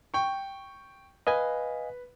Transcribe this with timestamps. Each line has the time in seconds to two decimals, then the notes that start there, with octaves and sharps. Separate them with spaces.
0.14 G5 C#6
1.27 B4 D#5 F5 G#5